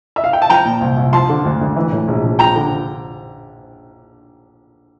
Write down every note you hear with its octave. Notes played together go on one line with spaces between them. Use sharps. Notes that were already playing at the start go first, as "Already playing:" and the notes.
E5
F5
G5
A5
F3 G5 A#5
A#2
C2
C2
F3 A5 C6
D3
D2
D2
E3
A2
A#1
A#1
F3 G5 A#5
D3